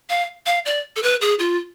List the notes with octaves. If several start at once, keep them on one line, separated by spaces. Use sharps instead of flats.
F5
F5
D5
A4
B4
G#4
F4